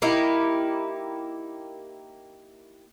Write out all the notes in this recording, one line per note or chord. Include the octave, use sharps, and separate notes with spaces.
A#3 D#4 E4 G4